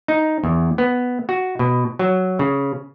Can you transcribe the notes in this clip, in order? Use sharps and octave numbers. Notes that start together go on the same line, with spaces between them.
D#4
E2
B3
F#4
B2
F#3
C#3